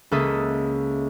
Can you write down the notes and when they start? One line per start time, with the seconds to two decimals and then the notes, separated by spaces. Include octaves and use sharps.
0.11 C#2 A#3 A4 E5 D#6